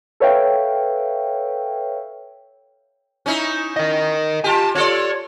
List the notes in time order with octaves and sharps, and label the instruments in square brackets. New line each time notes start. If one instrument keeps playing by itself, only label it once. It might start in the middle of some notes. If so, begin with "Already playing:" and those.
[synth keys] A4 B4 C#5 E5 F5 G5
[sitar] C#4 D#4 E4
[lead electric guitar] A#4 D#5
[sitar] F4 G4 [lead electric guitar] G#5 A5
[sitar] F4 A4 D5 [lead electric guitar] C#5